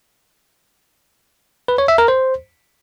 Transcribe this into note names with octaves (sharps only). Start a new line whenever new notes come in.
B4
C#5
E5
A#4
C5